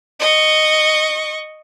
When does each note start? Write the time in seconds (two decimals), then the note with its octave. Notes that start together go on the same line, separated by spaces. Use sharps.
0.20 D#5 C#6